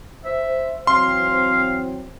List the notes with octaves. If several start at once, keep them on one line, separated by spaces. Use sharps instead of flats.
C5 E5
E3 F#3 C4 F5 C6